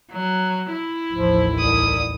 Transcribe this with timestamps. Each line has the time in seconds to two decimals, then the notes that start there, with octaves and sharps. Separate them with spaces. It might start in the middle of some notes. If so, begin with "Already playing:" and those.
0.12 F#3
0.71 E4
1.13 A1 D#2 F3
1.59 C2 D#6